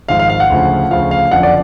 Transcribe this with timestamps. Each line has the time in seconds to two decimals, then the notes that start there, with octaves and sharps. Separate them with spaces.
0.08 G#1 G#2 F3 F5
0.19 F5
0.29 F5
0.40 F#5
0.50 D2 C#3 F3
0.91 D2 C#3 F3 F5
1.11 F5
1.31 F#1 F2 D3 F3 F#5
1.43 D5